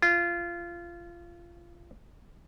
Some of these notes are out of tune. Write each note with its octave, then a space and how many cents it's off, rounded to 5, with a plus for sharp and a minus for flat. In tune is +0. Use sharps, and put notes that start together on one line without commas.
F4 -20